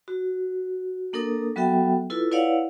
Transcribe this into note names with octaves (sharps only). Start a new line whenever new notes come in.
F#4
A#3 D4 A4 A#4 D#6
F#3 B3 F#4 A4 E5 G5
E4 F4 A4 B4
E4 B4 C#5 D5 F5 F#5